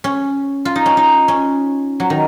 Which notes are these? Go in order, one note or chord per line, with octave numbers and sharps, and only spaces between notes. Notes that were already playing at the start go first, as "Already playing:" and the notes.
C#4
F4
D#4
C#4
D#4
C#4
F#3
D#3